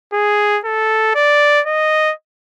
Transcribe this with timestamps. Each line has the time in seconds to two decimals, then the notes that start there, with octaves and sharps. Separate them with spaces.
0.13 G#4
0.65 A4
1.15 D5
1.67 D#5